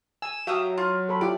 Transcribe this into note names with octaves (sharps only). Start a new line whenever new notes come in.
G#5 E6
F#3 G4 E5 F5 D#6
F4
A4 C#5 B5
E4 F4 G4 D5